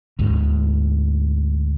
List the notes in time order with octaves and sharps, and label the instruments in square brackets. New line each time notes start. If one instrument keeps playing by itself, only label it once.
[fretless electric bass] D2 G#2